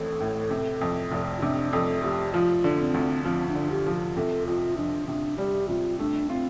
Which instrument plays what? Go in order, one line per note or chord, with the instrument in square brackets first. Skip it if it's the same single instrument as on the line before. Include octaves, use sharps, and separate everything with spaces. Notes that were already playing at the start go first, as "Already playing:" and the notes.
Already playing: [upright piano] A1 A2 C4 [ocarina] A4
[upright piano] A2
C3
F2
F1
[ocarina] F4
[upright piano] C3 [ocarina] D4
[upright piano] F2 [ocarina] A4
[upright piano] F1 [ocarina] G4
[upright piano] F3 [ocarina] F4
[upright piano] D3
[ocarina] D4
C4
[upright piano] D2
[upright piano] F3 [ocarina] C4
[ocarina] D4
[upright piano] D3
[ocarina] G4
[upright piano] F3
[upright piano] C3 [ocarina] A4
[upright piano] F2 [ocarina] F4
[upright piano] F2 [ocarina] D4
[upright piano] C3 [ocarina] D4
[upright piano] G3 [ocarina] G4
[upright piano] C3 [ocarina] F4
[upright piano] A3 [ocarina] D4
[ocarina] C4 [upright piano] F4